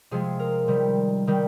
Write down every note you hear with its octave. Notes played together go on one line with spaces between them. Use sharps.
C3 F3 G#3 G#4
A#4
C3 D#3 G3
D#3 G3